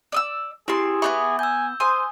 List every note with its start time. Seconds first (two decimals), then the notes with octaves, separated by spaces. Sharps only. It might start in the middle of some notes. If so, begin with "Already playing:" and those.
0.12 D5 D#6 E6
0.68 C4 E4 G4 G#4 C6
1.02 B3 D#4 E5 B5 C#6 D6
1.39 G#5 E6 G6
1.80 C5 G#5 C6 D#6